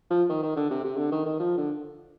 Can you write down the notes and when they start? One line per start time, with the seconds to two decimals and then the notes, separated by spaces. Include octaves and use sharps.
0.10 F3
0.29 D#3
0.43 D#3
0.56 D3
0.70 C3
0.84 C3
0.97 D3
1.12 D#3
1.25 D#3
1.39 F3
1.57 D3